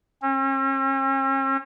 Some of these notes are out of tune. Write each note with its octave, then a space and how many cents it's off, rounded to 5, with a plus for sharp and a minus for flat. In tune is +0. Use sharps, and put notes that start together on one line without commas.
C#4 -45